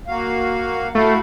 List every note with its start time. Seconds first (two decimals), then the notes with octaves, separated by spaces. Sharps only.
0.08 A#3 F#4 F5
0.95 A3 E4 F#4 F5